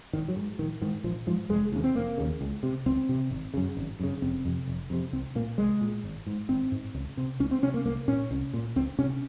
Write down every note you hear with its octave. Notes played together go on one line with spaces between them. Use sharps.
G#1 D#3
F#3
G#2
A#1 D#3
G#2 D#3
A#1 F3
G#2 F3
F1 G#3
D#2 C#3
C4
F1 A#3
D#2 C#3
C#2
C3
C#2 C4
C3
G#1
F#2 C#3
G#1
F#2 C#3
F1 C4
F2 C3
F1
F2 C3
C2 C4
A#2 A#3
C2 G#3
A#2
G#1
G#2
G#1 C4
G#2
C#2
C3
C#2 C#4
C4
C3 C#4
A#3
C2 A#3
A#2 C#4
C2
A#2
C#2 C4
C3 C#4